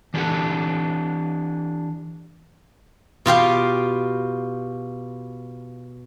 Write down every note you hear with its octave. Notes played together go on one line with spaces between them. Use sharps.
E3 D4 D#4 G4 A4 F#5
B2 F4 G4 F5